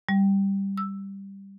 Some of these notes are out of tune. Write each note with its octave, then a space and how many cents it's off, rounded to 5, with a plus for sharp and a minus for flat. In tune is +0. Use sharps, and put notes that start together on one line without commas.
G3 +5
E6 +5